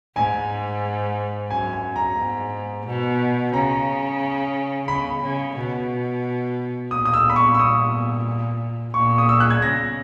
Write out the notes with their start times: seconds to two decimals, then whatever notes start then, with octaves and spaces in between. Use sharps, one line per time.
0.16 G#2 G#5
1.50 F#2 G#5
1.73 G#5
1.96 A#5
2.18 G#2
2.86 B2
3.53 C#3 A#5
4.88 C#3 B5
5.22 C#3
5.56 B2
6.91 A#2 D#6
7.05 D#6
7.14 E6
7.30 B5
7.36 C#6
7.55 E6
7.60 D#6
8.94 A#2 C#6
9.18 D#6
9.29 E6
9.40 F#6
9.50 G#6
9.62 C#3 A#6